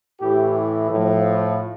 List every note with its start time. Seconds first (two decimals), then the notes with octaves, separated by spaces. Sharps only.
0.21 A2 E3 G4
0.91 A2 F3